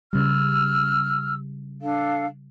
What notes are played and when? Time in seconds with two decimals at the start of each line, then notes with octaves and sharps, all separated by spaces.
0.13 C#3 G3 E6 F6
1.81 D4 A4 F5